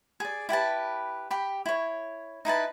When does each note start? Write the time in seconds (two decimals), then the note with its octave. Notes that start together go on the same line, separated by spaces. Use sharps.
0.20 G#4 D5
0.49 E4 G4 B4 A5
1.31 G4 B5
1.66 E4 C#5
2.45 D#4 E4 B4 A5